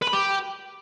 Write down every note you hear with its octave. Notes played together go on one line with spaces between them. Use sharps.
B4
B5
G4